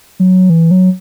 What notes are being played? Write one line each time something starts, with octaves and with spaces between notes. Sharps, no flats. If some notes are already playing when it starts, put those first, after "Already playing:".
F#3
E3
F#3